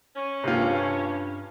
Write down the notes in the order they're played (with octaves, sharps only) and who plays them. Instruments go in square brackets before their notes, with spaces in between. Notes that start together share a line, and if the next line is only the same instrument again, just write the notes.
[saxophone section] C#4
[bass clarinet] G2 [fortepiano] C3 F4